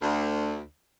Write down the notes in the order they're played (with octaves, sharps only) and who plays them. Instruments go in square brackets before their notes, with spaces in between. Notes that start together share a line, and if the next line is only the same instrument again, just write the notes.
[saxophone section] D2